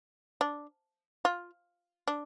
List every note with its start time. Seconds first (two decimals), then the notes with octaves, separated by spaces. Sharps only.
0.41 D4
1.25 F4
2.08 D4